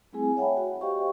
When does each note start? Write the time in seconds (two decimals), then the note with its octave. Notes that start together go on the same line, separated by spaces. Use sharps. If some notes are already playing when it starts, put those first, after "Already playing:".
0.13 G3 A3 C4 E4 G#4 G#5
0.37 C#5 E5 F#5 G5 A5 B5
0.57 F#4
0.81 G4 C5 D#5 F5 G5 C#6